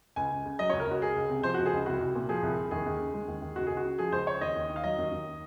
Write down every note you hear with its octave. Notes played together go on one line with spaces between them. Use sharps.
C#2 G#5
C#2
C#3
F#3 D#5
C#2 C#5
A#4
C#2 F#4
C#2 G#4
C#2
C3
F3 C5
C#2 F#4
G#4
C#2
C2 F#4
C2
A#2
F3 G#4
C2
C2
D#2 G#4
D#2
C#3
G#3
D#2
D#2
C#2 F#4
C#2 G#4
F#4
C#3
F3 G#4
C#2 C5
C#2 C#5
D#2 D#5
D#2
D#3
F5
F#3 D#5
D#2
D#2